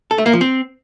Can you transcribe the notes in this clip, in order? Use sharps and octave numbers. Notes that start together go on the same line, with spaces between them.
A4
A3
A#3
F3
C4